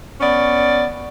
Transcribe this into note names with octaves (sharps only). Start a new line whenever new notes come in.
B3 C#4 D5